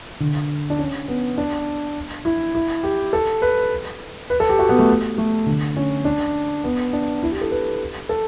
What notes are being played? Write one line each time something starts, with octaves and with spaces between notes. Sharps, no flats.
D3
D4
C#4
B3
D4
E4
E4
G4
A4
B4
B4
A4
G4
F#4
B3
A3
A3
D3
C#4
D4
B3
D4
E4
G4
A4
B4
A4